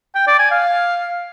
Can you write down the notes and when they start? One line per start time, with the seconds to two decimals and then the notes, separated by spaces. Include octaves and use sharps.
0.15 G5
0.27 D5
0.39 G#5
0.51 F5